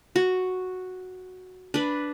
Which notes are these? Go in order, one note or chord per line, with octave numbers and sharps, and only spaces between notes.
F#4
D4 B4